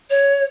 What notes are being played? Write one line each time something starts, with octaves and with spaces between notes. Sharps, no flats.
C#5